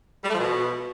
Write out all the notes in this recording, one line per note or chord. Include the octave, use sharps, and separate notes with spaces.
G3
A3
F3
B2